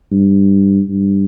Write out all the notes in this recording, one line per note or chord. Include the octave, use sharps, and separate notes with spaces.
G2
G2